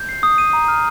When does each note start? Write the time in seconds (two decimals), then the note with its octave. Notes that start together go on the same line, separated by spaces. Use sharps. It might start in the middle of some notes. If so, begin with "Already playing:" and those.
Already playing: G6
0.09 C7
0.23 D#6
0.38 D#7
0.53 A#5
0.68 F6